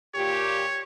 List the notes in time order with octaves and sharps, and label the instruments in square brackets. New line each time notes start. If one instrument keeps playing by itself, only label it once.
[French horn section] A#2 G4 [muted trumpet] C#5